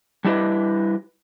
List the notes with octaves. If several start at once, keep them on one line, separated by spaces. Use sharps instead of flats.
G3 D4 E4 G4 B4 D#5